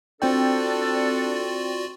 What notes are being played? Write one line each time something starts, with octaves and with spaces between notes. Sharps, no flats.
C4 D4 F4 F#4 A4 D5 G5